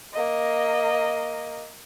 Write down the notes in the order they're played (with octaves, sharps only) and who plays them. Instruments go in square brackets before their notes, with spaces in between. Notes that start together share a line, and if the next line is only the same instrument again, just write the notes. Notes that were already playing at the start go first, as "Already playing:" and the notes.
[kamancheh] A#3 D#5